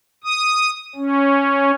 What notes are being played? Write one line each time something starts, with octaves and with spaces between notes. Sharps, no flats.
D#6
C#4